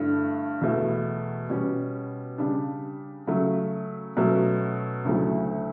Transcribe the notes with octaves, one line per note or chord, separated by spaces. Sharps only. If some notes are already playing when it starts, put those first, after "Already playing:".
Already playing: G2 D3 A3 E4
E2 B2 A3 E4
B2 G3 C#4
C#3 G3 D4
C#3 F#3 A3
B2 F#3 A3 C#4
D2 C#3 F#3 A3 E4